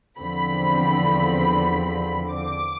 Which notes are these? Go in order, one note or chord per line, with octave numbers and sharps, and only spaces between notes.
E2 D3 F3 C4 B5
D6